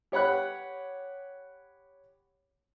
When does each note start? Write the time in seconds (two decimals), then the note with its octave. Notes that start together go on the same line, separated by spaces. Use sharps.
0.12 G4 C#5 F#5 B5 F#6